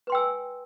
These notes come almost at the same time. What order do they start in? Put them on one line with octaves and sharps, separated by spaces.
B4 C6 G5 E6 G#5